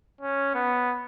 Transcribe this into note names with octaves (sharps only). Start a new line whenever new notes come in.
C#4
B3